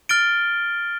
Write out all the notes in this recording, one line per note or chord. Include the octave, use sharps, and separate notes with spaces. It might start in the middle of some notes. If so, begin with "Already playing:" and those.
F6 A6 D7 G7